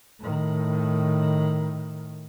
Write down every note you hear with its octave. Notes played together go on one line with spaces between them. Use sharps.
A2 D#3